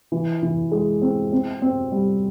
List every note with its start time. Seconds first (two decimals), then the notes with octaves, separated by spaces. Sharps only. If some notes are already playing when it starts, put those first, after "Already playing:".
0.12 E3
0.43 E3
0.71 G#3
1.02 C4
1.32 C4
1.62 C4
1.92 G3